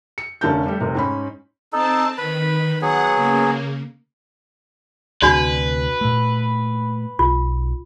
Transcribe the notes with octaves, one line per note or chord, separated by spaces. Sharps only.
C#7
F1 D3 C#4 A#4 A5 G6
G3 A3 G4
F1 C3 A#4
G#2 C#4 B5
C4 D#4 A4 A5
D#3 B4 B5
F#3 B3 G#4 F#5
C#3 A#3
D2 C3 D4 F#4 B4 D5
A#2 A3
B1 F4